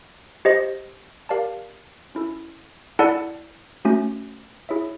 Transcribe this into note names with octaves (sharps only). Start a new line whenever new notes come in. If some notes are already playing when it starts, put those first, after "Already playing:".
G4 C5 D#5
G4 A#4 D5 F5 A5
C#4 E4 A4
E4 A4 D5 F#5 A5
A3 C#4 F#4
E4 G#4 C#5 E5